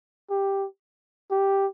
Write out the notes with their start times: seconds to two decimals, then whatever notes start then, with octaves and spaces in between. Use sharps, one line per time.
0.30 G4
1.31 G4